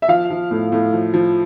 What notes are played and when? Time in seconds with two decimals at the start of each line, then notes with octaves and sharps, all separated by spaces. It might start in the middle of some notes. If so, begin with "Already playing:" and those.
0.02 E5
0.08 F3 F5
0.30 F3
0.51 A2
0.72 A2
0.93 F3
1.14 F3